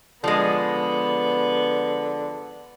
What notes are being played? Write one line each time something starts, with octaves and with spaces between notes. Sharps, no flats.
D3 F3 G#3 B3